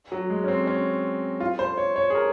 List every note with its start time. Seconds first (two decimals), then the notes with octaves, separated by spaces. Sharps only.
0.12 F#3
0.30 G#3
0.44 C#4
0.48 C4
0.67 C#4
1.40 F4
1.59 C5
1.78 C#5
1.96 C#5
2.10 G#4
2.15 A#4